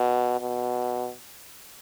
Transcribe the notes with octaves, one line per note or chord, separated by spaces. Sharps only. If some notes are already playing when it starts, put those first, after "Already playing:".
Already playing: B2
B2